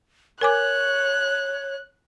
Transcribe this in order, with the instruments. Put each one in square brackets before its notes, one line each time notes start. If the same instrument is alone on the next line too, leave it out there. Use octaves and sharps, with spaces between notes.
[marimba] A#4 G#5 D6 [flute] C#5 [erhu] F#6